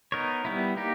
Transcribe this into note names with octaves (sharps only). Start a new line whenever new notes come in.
B3 D#4 A#4 C#5
G3 B3 E4
A#3 D#4 G4